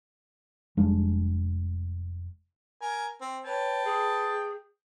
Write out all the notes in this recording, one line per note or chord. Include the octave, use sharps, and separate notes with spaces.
F1 G3 G#3 D4
A#4 G#5
C4
B4 C#5 G5 A5
G#4